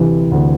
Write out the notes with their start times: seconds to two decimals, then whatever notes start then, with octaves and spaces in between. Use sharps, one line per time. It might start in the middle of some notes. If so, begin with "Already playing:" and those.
Already playing: D2 C3 E3
0.31 D2